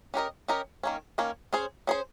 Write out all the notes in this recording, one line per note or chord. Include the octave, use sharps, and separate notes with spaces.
C#4 G4 A#4 D#5
C#4 G4 A#4 D#5
D#3 A#3 C#4
D#3 A#3 C#4
C#4 G#4 C5
C#4 G#4 C5